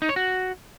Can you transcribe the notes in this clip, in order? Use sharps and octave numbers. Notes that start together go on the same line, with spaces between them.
D#4
C#5
F#4